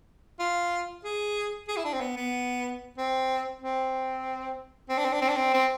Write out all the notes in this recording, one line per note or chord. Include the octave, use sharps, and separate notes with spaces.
F4
G#4
G#4
E4
D4
C4
B3
B3
C4
C4
C4
D4
C4
D4
C4
D4
C4
C4